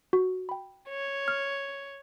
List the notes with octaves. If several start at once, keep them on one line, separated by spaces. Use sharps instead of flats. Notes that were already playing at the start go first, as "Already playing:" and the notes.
F#4
G5 B5
C#5
F6